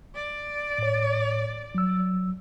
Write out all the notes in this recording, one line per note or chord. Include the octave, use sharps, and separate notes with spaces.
D5
A2 C#5
F#3 E6